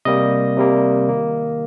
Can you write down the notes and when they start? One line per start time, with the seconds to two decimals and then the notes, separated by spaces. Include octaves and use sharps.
0.05 C3 G3 A#3 D#5
0.57 C3 G3 A#3
1.08 D#3 A#3